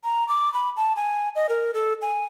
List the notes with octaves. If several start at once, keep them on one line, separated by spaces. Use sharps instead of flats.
A#5
D6
B5
A5
G#5
D#5
A#4
A4
G#5